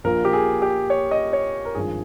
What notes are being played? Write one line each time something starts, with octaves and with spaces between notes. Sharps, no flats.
A#1 A#2 F3 A#4
G4
G#4
G4
C#5
D#5
C#5
A#4
G#1 G2 F3 G#4